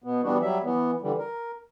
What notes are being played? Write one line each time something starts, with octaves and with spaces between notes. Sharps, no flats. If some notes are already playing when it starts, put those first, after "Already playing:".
B2 B3
E3 G3 B3 D4 F#4
F#3 G3 E5
E3 B3
D3 E3 G3
A#4